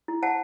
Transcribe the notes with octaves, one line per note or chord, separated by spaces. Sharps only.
E4
C5 F#5 A5